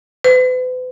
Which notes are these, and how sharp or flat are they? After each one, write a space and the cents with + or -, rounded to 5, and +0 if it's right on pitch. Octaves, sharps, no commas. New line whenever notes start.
B4 +40